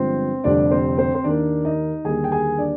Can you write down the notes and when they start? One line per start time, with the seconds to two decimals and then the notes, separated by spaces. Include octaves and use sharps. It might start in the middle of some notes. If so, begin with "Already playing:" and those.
Already playing: G1 G2 F3 G#3 C4 C5
0.44 F1 F2 D3 G3 D4 D5
0.71 C4 C5
0.98 C4 C5
1.15 C5
1.24 D#2 D#3 A#3 D4 D5
1.65 D#4 D#5
2.04 D#2 D3 G3 A#3 G#4 G#5
2.24 G5
2.31 G#4 G#5
2.58 D4 D5